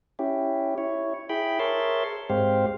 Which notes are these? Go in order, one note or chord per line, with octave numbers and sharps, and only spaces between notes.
C#4 E4 G4
E4 C#5
E4 G#4 G5 B5
G#4 A#4 C#5 E5 A5 C6
G#2 G#3 C4 G4 C5 F5